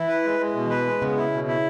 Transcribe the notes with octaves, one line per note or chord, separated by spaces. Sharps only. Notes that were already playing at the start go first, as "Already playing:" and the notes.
Already playing: E3 E4
B4
G#3
G#3
B2
B4
G#3
C#3 B3
E4
B2
E4